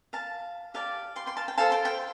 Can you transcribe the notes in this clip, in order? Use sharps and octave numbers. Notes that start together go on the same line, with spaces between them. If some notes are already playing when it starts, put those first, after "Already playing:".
F5 A5
G4 D5 F5 A5
G5 C6
G5 C6
F5 A5
G5
F4 A4 C5 F5 A5
G5 C6
G5 C6